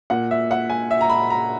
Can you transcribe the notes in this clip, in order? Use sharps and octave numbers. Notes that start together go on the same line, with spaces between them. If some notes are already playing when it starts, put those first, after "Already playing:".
A#2 F#5
E5
F#5
G#5
E5
A#5
B5
A#5